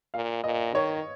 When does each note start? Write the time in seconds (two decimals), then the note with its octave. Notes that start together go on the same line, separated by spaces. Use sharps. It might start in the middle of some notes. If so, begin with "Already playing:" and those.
0.14 A#2 F5
0.44 A#2 D#5
0.74 D#3 C#5